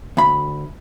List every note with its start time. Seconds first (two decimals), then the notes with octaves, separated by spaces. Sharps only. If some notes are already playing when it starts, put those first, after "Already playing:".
0.17 D2 B5